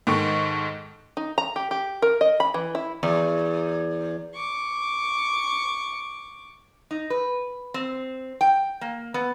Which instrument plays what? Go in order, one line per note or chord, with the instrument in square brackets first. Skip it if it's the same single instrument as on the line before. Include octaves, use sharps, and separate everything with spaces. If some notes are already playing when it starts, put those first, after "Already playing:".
[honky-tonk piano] G#2 D#3 A4 C#6
[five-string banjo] D#4
A#5
G4
G4
A#4
D#5
B5
E3
E4
[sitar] E2
[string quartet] C#6 D6
[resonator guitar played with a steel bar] D#4
B4
C4
G5
A#3
B3